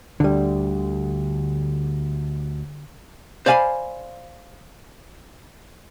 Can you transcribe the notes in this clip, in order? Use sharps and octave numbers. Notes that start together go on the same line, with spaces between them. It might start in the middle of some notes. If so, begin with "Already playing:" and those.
D2 D3 G3
C5 D5 F5 G#5 A#5 B5